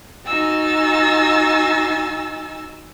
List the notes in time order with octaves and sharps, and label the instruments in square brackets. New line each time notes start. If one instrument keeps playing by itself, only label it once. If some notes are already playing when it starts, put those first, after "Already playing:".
[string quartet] D#4 F#4 G#5 E6 A6